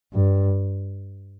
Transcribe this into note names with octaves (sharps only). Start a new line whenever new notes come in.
G2